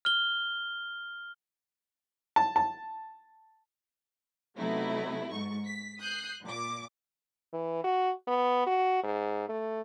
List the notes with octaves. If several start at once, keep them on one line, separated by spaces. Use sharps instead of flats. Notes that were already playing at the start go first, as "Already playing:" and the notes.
F6 G7
A5
A5
C3 F#3 A3 B3 D#4 E4
G#2 C#6
B6
D#6 F#6 G6 C7
A#2 D6
E3
F#4
B3
F#4
G#2
A3